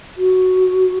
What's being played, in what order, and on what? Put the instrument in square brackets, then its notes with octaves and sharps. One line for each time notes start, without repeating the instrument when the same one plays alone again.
[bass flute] F#4